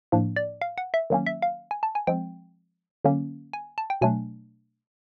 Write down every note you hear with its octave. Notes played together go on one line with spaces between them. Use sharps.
A2 F3 A#3 D4
D5
F5
F#5
E5
D#3 F#3 A#3 C#4
E5
F5
G#5
A5
G#5
F3 G#3 C4 G5
D3 F#3 A#3 C#4
G#5
A5
G5
B2 F#3 A3 D4 G#5